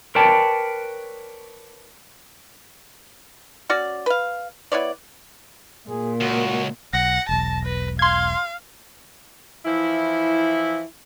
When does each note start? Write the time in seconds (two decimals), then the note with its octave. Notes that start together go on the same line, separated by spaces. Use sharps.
0.15 A#4 B4 C#5 D5 G5 A5
3.69 C#4 F#4 D5
4.06 B4 F5
4.72 B3 E4 C#5 D5
5.89 A#2 G#4
6.20 C#2 F#4
6.93 B1 F#5 A#6
7.29 E1 B1 A5
7.65 B4
7.99 F5 C6 G#6
9.66 E3 F3 E4